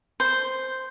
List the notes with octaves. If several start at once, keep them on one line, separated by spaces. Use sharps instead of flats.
C5